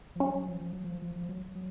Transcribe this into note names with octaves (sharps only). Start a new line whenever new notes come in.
F3
F#3 C#4
F#3
F3
F3
F#3
F3
F3
F3
F#3
F#3